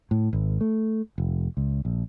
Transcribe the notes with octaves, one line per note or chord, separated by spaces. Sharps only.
A2
G#1
A3
F1
C#2
A#1